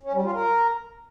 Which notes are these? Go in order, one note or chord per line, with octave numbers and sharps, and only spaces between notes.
C#4
G3
F4
A#4